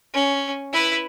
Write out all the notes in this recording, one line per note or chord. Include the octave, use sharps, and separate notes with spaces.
C#4
E4 B4